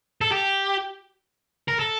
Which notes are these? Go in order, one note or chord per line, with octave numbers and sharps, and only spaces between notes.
A4
G4
A#4
A4